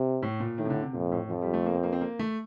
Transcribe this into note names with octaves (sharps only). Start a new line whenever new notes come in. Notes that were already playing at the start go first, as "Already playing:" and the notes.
Already playing: C3
A2
A#2
A2 D#3
C3
D3
C3
F2 A#2
A2
F2 F3
G3
A3
A#3
C4
A#3
C4
A#3
A3